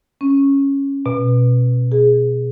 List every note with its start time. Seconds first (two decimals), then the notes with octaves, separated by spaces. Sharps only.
0.21 C#4
1.06 B2
1.92 G#4